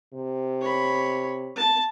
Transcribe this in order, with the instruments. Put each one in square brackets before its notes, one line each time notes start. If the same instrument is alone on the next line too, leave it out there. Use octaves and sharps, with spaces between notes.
[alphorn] C3
[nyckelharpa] C#5 B5
A5